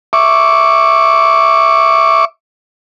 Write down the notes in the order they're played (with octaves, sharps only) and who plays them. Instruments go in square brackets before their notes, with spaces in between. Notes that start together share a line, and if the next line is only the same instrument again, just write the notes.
[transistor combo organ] E5 C#6 D6